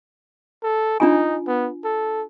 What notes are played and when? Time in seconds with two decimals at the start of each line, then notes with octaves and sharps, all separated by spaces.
0.63 A4
1.00 D4 D#4 F4 G#5
1.47 B3
1.84 A4